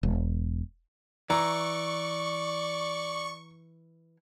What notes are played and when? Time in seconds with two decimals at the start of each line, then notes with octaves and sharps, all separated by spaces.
0.03 E1
1.30 E3 D5 A#5 C#6